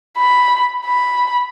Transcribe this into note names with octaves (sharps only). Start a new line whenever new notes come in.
B5
B5